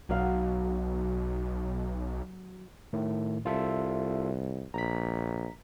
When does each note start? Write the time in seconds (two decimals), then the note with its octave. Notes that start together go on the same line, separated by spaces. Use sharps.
0.09 B1 F#3 F5
2.93 A2 D#3 A3
3.46 C2 F4 A4 E5
4.74 A#1 A#5 B6